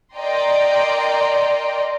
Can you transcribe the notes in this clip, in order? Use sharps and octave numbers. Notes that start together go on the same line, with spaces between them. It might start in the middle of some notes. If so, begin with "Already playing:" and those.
A#4 D5 D#5 G5 A#5 C6